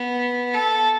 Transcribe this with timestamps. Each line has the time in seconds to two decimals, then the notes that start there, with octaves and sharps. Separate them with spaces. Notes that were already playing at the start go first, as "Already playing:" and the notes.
Already playing: B3
0.54 A4